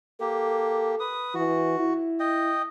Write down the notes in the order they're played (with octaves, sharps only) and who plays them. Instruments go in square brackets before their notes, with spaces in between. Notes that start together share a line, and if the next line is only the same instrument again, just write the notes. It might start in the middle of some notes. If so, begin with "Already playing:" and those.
[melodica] A#3 G4 [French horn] A4
[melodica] B4 D#6
[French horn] E3 [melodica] F#4
[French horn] E4
[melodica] D#5 G5